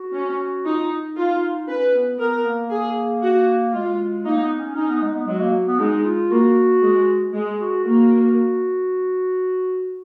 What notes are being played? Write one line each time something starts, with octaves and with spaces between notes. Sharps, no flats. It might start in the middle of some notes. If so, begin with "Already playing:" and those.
Already playing: F#4
C#4
D#4 F4
D#4
F4
C#4 B4
B3
B3 A#4
A#3
G#4
F#4
G#3 F4
A#3 D#4
B3
C#4
C#4 D#4
B3
G#3
B3
F#3 G#3
A#3
B3
G#3 D#4
F4
A#3 F#4
G#3
G#3
F#4
A#3 F#4